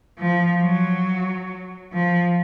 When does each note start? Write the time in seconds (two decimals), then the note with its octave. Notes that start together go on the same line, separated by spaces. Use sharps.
0.19 F3
0.63 F#3
1.93 F3